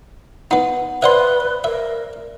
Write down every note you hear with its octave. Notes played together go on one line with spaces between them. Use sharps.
B3 D#4 F#5
B4 C5 D5 E5 F#5 C6 G7
A#4 E5